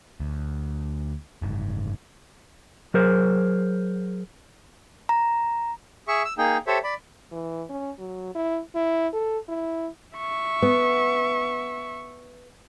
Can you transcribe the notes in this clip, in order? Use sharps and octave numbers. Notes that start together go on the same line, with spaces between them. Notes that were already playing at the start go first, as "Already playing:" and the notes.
D2
F#1 G#2
F#3 G#4 A#4 C5
A#5
G#4 E5 C#6
E6
A#3 D#4 G#4 G5
G4 A4 C5 C#5 E5
D5 B5
E3
C#4
F#3
E4
E4
A4
E4
E5 C#6
B3